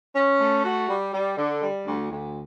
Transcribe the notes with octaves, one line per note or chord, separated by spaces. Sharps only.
C#4
A3
F#4
G3
G3
D3
G3
D2
D2